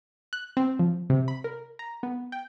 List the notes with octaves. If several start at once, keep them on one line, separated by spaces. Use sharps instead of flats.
F#6
C4
F3
C3
B5
A#4
A#5
B3
G5